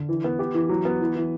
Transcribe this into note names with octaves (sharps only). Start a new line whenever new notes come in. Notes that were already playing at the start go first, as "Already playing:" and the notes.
Already playing: D3
E3
B3
G4
E3
F#3
B3
E3
E3